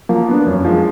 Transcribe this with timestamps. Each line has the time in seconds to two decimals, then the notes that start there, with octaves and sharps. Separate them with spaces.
0.09 F3 F#3 A#3
0.28 B3 D4
0.47 F#2
0.65 F3 G#3